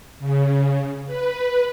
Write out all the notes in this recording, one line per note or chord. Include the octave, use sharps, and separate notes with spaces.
C#3
B4